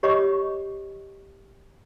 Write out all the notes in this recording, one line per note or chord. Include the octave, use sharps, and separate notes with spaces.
G4 C#5 D#5 B5 C#6 D6